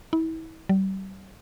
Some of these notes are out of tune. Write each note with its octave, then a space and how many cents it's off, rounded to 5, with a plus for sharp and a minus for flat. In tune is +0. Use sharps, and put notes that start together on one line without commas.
E4 -35
G3 -35